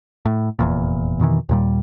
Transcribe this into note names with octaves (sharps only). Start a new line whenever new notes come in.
A2
F1 E2 A#2
F2 B2 D#3 E3
D#2 A#2 G3